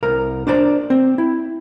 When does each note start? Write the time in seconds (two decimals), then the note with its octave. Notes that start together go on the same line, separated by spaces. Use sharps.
0.03 C2 A#4 A#5
0.47 D4 C5 D5 A#5
0.90 C4
1.18 E4